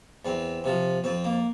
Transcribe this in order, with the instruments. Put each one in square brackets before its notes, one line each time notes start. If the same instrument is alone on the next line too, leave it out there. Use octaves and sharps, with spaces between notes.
[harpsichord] E2 C4
C3 F3
F2 C4
A#3